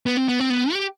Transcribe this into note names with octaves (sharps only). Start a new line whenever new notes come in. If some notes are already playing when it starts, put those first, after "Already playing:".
B3
C4
B3
C4
B3
G4